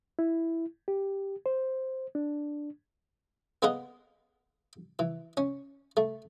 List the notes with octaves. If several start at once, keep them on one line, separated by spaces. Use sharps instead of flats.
E4
G4
C5
D4
A#3 B3 G#4 A#4 B4 D#5
E3
C#4
A3